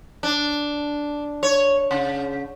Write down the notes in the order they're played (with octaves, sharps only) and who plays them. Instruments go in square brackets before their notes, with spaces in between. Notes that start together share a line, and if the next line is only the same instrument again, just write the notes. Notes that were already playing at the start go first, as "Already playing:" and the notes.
[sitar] D4
C#5
C#3